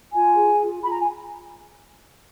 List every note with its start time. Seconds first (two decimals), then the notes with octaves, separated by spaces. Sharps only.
0.12 F4 G#5
0.35 G#4
0.59 F4
0.82 F4 B5
0.90 A#5
1.00 G#5